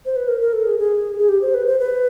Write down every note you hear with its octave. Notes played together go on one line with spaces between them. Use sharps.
C5
B4
A#4
A#4
A4
G#4
G#4
G#4
G4
C5
B4
C5
B4